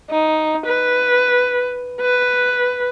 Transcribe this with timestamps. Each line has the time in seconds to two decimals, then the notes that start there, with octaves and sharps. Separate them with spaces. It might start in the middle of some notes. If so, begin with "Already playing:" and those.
0.10 D#4
0.66 B4
2.02 B4